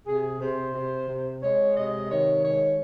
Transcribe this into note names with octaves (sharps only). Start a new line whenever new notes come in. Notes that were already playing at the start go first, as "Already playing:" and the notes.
C3 G#4
C3 C5
C3
C3
G#3 C#5
C3 D#5
D#3 C#5
G#3 C#5